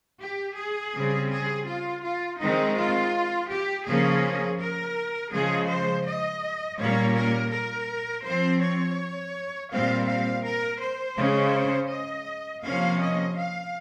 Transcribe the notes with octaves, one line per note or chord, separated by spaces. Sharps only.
G4
G#4
C#3 G3 C4
G#4
F4
F4
D#3 G#3 C4 D#4
F4
G4
C#3 F3 A#3 C#4 G#4
A#4
C#3 F3 G#3 G#4
C5
D#5
A#2 G3 A#3 C#4 C#5
A#4
A#4
F3 C4 C5
C#5
A#2 G3 C4 F5
F5
A#4
C5
C#3 G#3 C#4
D#5
C3 F3 A#3 C#4 F5
D#5
F5